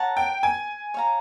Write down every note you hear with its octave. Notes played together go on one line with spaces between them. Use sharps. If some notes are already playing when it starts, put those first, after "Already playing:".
Already playing: A#4 C#5 F#5 A5
G5
G#5
C#5 F5 A#5